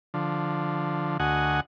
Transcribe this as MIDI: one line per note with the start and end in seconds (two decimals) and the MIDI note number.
0.14 1.17 50
0.14 1.17 53
1.20 1.60 38
1.20 1.60 66
1.20 1.60 75
1.20 1.60 78
1.20 1.60 80